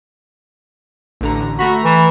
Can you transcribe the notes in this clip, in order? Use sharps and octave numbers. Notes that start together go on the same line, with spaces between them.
A1 D3 A#5
A3 F#4 A#5 B5
E3